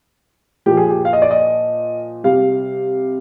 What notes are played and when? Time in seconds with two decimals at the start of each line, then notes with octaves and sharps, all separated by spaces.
0.66 A#2 F3 G4
0.77 G#4
0.90 G4
1.05 F5
1.13 D#5
1.22 D5
1.31 D#5
2.24 C3 G3 F5